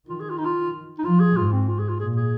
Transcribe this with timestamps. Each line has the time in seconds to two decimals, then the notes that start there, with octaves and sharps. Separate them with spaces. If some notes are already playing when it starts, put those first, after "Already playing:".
0.09 D#3 F4
0.20 G#4
0.30 F4
0.38 D#4
0.45 F4
0.98 D#4
1.04 F3 F4
1.20 G#4
1.37 G#2 F4
1.52 C4
1.68 F4
1.79 G#4
1.89 F4
2.00 A#2 G#4
2.16 G#4